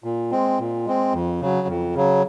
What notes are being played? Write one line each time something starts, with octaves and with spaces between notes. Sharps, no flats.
A#2
G#3 C4
A#2
G#3 C4
F2
C#3 F#3
F2
C#3 F#3